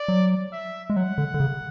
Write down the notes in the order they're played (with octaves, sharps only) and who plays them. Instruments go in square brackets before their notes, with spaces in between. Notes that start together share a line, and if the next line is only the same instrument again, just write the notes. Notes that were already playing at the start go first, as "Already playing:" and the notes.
Already playing: [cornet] D5
[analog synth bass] F#3
[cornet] E5
[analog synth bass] G#3
[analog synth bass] F#3 [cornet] F#5
[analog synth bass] D3
D3
C#3